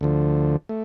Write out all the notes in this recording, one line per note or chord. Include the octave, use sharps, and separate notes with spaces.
D2 D3 F3
A3